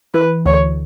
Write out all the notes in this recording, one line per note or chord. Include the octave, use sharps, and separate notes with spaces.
E3 B4
D2 C#5